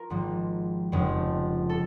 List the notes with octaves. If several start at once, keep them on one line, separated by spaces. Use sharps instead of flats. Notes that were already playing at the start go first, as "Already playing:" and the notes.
Already playing: F4 A#4
G#1 G#2 F3
F1 F2 C#3
A4